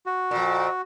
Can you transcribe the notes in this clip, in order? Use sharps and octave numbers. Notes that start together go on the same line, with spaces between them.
F#4
F2 A#2